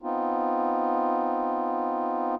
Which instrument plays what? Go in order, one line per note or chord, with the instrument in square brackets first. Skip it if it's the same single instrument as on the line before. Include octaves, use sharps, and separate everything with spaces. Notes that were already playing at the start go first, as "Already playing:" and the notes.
[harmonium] B3 C4 D#4 F4